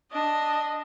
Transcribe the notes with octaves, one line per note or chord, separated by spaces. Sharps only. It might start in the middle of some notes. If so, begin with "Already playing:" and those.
D4 D#5